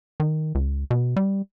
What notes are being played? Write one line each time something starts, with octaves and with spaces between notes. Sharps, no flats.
D#3
C#2
B2
G3